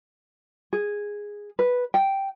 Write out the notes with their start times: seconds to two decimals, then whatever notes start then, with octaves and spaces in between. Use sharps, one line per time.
0.73 G#4
1.59 B4
1.94 G5